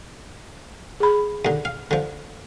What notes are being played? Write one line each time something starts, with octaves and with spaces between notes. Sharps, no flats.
G#4 B5
D#2 D3
F5
D3 F3